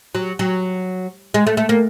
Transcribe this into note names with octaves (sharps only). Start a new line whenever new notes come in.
F#3
F#3
G#3
A3
A3
A#3